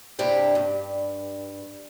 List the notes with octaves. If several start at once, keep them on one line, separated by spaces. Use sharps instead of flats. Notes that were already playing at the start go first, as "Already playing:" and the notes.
G2 C3 D4 E4 G4
G2